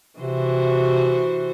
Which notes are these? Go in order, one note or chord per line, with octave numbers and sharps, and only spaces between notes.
C3 E3 F#4 C5